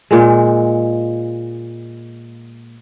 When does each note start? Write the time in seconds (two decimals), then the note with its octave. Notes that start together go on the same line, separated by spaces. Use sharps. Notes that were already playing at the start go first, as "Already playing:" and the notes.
0.11 A#2 G#3